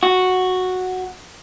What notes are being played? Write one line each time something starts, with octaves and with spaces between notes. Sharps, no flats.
F#4